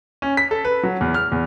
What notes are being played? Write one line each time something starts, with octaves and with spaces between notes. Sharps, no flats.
C#4
B6
A4
B4
F#3
E2
F6
E2